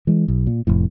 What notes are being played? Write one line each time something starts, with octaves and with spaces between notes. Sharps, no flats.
E3 G#3
B1
A#2
F1 F2 A2